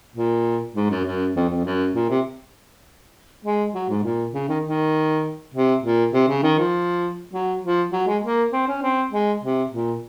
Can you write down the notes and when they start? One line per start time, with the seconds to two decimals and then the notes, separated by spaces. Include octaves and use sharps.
0.16 A#2
0.76 G#2
0.90 F#2
1.05 F#2
1.36 F2
1.50 F2
1.65 F#2
1.95 A#2
2.10 C3
3.45 G#3
3.74 F#3
3.89 G#2
4.04 A#2
4.34 C#3
4.48 D#3
4.64 D#3
5.54 C3
5.84 A#2
6.14 C3
6.28 C#3
6.43 D#3
6.59 F3
7.33 F#3
7.63 F3
7.92 F#3
8.07 G#3
8.23 A#3
8.53 C4
8.68 C#4
8.83 C4
9.12 G#3
9.42 C3
9.72 A#2